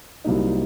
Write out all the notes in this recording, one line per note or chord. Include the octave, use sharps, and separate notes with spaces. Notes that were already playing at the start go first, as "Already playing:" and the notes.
C2 C3 F#3 A#3 D#4